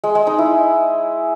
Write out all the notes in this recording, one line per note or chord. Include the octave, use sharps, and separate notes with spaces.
G#3
G#3
D#4
E4